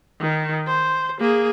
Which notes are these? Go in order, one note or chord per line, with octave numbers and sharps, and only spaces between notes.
D#3
C5
A#3 G#4